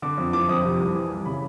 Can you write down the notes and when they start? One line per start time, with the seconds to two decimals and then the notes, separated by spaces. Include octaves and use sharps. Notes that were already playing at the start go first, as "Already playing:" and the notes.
0.02 D3 D6
0.18 F2
0.33 F3 D6
0.49 F2 D#6
0.65 C3
0.79 C2
0.95 E3
1.11 C2
1.26 C#3 B5